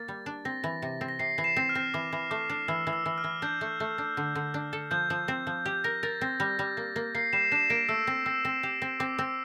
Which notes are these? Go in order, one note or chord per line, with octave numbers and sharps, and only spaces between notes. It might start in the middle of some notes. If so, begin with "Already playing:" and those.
Already playing: A#3 A6
G3
D4
C4 A#6
E3
C3
C4
A#6
C3 C7
E3
C7 E7
C4
F6
C4
E3 D6
E3
A3 D6
D4
E3 E6
E3
E6
E3
F6
E3
D4 G6
A3
A3
D4
D3
D3
D4
A4
F3 G6
F3
C4
F3
G4 G6
A#4 A#6
A#4 A6
C4 A#6
G3 A#6
G3
A#3
A#3
A#3 C7
G3 C7 E7
D4 C7 E7
A#3 A#6 D7
A3 E6
C4
C4 E6
C4
G4
C4
C4 D6
C4 E6